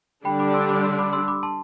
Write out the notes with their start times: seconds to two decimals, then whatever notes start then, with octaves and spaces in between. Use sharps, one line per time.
0.25 D3 G3 D4 G5 B5
0.39 B5 D6
0.54 C6 E6
0.69 B5 D6
0.83 C6 E6
0.99 B5 D6
1.13 C6 E6
1.28 B5 D6
1.43 A5 C6